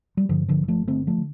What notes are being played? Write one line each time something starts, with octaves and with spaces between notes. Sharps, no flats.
G3
G2 D3 F3
D3 F3
G1
F3 A3
D3 A3 C4
F3 A3
D3